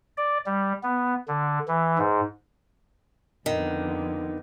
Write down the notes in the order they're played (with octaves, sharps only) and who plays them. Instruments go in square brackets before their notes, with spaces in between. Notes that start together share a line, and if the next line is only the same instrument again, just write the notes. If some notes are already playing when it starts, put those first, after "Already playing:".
[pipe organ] D5
G3
B3
D3
E3
G#2
[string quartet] F2 D3 B3 [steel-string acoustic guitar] D#3